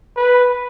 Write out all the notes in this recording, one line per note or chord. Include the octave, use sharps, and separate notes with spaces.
B4